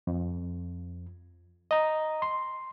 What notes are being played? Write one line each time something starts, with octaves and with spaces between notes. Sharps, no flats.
F2
D#5 A#5
C6